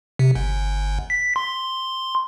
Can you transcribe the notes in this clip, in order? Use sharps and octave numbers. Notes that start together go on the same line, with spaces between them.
C3
G1
B6
C6